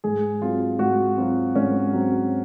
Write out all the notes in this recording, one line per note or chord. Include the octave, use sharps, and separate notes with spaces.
G#2 G#4
F#3 C4 F4
G#2 F#4
F#3 C4 F4
G#2 C#4
F#3 C4